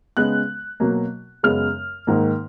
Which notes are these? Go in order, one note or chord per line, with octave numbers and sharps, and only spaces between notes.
C#3 G#3 B3 F#6
B2 F#3 A#3
F#2 C#3 G#3 B3 F6
G#2 D#3 A#3